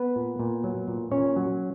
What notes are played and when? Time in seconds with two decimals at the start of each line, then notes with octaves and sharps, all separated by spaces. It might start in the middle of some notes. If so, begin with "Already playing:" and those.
Already playing: B3 B4
0.16 A#2
0.39 A#2
0.64 F#3
0.88 A#2
1.12 A#2 C#4 C#5
1.36 F#3